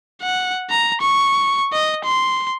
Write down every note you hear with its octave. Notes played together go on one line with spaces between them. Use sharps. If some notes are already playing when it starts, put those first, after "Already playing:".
F#5
A#5
C#6
D#5
C6